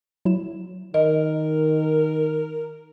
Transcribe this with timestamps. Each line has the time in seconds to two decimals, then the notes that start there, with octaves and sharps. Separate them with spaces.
0.25 F#3 E4 E7
0.94 D#3 A#4 D#5